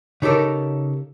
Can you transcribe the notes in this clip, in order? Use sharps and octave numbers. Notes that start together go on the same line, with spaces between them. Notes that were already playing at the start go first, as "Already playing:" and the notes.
C#3 D#4 G4 A4 A#4